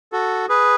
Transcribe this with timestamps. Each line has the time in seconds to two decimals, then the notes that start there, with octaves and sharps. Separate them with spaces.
0.12 F#4 A4
0.49 G#4 B4